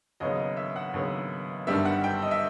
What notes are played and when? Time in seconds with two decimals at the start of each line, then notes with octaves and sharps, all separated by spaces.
0.20 D#2 C#3 F#3 B3 D#5
0.39 D#5
0.57 E5
0.76 F#5
0.94 D#2 C#3 F#3 B3
1.67 G1 G2 D#3 G3 B3 E5
1.85 F#5
2.04 G5
2.22 D#5
2.31 E5